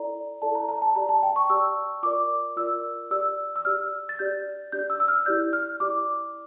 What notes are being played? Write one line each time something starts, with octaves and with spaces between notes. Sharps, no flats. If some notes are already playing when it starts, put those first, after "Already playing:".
Already playing: E4 A4 D5 A#5
E4 A4 D5 A5
A#5
A#5
A5
G4 D5 A#5
A5
G5
C#6
G4 D5 E6
F4 A#4 D5 D6
F4 A#4 D5 E6
G4 D5 E6
E6
G4 D5 F6
A6
D4 G4 D5 G6
D4 G4 D5 G6
E6
E6
F6
E4 G4 D5 G6
F6
E4 G4 D5 D6